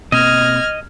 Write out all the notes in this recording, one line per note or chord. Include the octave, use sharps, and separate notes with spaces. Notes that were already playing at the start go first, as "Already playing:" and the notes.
B2 A#3 C4 D#5 F6 G#6 A#6